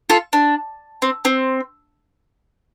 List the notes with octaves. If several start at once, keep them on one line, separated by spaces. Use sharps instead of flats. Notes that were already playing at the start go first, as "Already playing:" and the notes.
F4 A4
D4
C4
C4